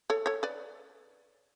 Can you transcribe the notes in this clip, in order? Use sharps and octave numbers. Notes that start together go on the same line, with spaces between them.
A4 C#5
A4 C#5
B4 D5